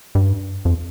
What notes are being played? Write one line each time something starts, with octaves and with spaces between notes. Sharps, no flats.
G2
F2